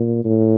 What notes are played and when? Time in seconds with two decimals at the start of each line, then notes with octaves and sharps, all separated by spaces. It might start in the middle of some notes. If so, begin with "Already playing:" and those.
Already playing: A#2
0.24 A2